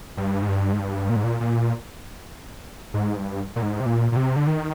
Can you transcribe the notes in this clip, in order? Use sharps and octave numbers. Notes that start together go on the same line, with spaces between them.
G2
G#2
G2
G#2
G2
A#2
G#2
A#2
A#2
G#2
G2
A#2
G#2
C3
A#2
A#2
C3
D3
D#3